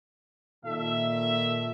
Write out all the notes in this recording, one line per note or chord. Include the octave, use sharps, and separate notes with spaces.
A#2 D#3 A4 E5